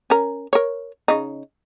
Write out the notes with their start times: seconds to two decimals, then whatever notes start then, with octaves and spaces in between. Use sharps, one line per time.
0.10 C#4 A#4
0.53 A#4 C#5
1.08 C#3 D#4